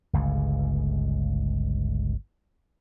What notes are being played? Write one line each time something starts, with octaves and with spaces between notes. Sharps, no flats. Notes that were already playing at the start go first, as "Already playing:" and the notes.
G1 C#2 C#3